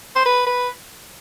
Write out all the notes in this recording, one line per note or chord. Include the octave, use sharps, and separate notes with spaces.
C5
B4
B4